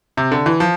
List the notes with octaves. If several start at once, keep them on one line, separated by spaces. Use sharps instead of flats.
C3
D3
E3
F3